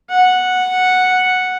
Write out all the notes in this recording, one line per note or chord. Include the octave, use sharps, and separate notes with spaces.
F#5